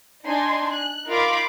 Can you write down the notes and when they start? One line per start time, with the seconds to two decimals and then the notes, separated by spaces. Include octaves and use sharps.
0.25 D4 D#4 G#5 C6
0.73 F#6
1.08 D#4 F4 A#4 F5 B5 D6